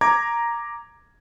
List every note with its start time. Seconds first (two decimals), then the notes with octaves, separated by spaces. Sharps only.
0.01 A#5 D6 G#6